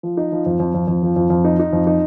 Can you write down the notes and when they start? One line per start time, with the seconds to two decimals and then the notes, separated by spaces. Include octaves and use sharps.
0.03 F3
0.17 D#4
0.32 F3
0.46 F2
0.60 F2
0.74 F2
0.88 F2
1.03 F3
1.16 F2
1.30 F2
1.44 D#4
1.59 D#4
1.73 F2
1.87 D#4